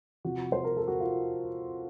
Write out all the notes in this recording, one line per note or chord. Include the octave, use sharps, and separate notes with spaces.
C3 F3 F#4
C5
A#4
A4
F#4
F4